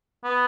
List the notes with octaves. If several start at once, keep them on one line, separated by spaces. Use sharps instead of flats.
B3